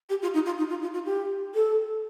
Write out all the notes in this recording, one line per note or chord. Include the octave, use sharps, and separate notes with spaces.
G4
F4
D#4
F4
D#4
F4
F4
F4
G4
A4